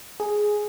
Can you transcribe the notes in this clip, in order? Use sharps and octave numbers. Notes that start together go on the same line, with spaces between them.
G#4